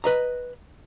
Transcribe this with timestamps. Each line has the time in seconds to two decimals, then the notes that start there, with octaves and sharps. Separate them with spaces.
0.04 B4 D#5 A#5